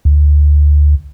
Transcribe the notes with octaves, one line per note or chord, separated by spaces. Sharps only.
D2